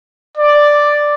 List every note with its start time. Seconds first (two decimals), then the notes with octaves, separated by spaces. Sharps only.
0.37 D5